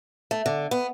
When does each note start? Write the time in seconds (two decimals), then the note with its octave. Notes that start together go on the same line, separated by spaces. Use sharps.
0.31 A3
0.46 D3
0.71 B3